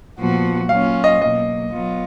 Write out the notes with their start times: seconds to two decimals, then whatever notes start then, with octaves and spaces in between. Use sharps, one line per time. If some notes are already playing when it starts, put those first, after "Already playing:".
0.19 A#2 F3 B3 F#4
0.69 F#3 A#3 C#4 F4 F5
1.04 D#5
1.21 B2 F#3 A#3 D#5
1.72 F#3 B3 F4